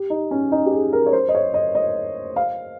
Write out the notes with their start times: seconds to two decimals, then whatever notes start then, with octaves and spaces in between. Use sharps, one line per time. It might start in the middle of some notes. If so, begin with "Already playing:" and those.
Already playing: G4
0.10 D#4
0.31 C#4
0.52 D#4
0.66 G4
0.73 G#4
0.93 A#4
1.06 C#5
1.13 C5
1.29 D#5
1.35 C#5
1.54 D#5
1.75 D#5
2.36 F5